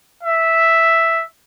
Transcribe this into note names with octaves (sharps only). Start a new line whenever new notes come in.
E5